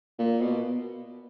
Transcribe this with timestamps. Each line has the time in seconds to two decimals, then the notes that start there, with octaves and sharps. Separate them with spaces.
0.19 A#2
0.41 B2